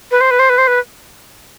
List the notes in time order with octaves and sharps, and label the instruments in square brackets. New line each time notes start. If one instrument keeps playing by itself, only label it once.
[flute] B4
C5
B4
C5
B4
C5
B4